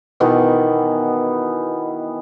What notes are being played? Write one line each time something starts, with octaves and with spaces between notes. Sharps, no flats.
B2 D#3 E3 B3